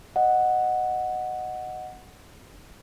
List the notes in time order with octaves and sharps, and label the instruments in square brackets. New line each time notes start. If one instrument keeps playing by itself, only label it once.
[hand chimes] D#5 F#5